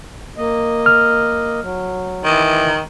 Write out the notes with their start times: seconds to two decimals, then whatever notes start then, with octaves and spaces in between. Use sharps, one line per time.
0.37 A#3 D#5
0.86 F6
1.62 F#3
2.24 D#3 E3